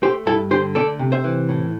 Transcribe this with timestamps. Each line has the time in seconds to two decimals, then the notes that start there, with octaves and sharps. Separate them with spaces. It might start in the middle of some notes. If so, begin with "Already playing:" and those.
0.02 A3 G4 C5
0.26 G2 E4 A4
0.51 D3 G4 C5
0.75 A3 A4 D5
0.99 C3
1.12 C5 E5
1.24 E3
1.49 A2